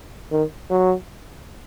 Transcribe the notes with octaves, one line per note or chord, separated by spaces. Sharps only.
D#3
F#3